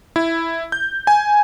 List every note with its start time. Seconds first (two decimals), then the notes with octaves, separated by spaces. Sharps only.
0.16 E4
0.72 G6
1.07 G#5